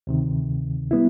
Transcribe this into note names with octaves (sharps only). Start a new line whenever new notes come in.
D2 C3 D#3
G3 B3 E4